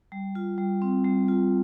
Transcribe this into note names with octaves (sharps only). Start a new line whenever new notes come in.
G3
F4
G3
C4
G3
F4